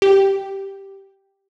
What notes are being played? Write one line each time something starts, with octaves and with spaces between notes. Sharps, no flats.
G4